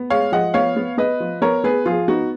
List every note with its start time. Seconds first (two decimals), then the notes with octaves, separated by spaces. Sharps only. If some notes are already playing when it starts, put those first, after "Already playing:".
Already playing: B3
0.10 G#3 C#5 F5
0.32 F3 D#5 F#5
0.54 B3 C#5 F5
0.76 B3
0.98 B3 B4 D#5
1.20 F3
1.42 B3 A#4 C#5
1.64 B3 G#4 B4
1.86 F3 F4 G#4
2.08 B3 D#4 F#4